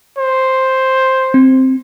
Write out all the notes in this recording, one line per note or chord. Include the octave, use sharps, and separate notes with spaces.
C5
C4